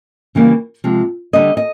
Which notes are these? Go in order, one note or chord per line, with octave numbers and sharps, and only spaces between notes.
C#3 E3 G3 A#3
C3 F3 G#3
D3 G3 B3 D#5
D#5